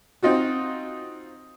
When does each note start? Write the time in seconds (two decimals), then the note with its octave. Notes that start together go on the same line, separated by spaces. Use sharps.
0.23 C4 D#4 F4 F#4